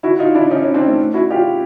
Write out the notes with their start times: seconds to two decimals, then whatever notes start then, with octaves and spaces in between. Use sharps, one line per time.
0.03 E4 F#4
0.19 D#4 F4
0.34 D4 E4
0.50 C#4 D#4
0.63 C#4 D#4
0.74 C4 D4
0.87 A3
1.14 E4 F#4
1.30 F4 G4